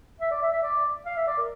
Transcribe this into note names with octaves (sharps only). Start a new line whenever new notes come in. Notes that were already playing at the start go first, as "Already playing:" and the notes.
E5
D5
E5
E5
D5
F5
E5
D5
A#4